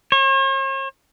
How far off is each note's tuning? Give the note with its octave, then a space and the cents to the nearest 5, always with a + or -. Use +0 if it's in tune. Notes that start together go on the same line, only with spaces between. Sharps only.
C#5 -45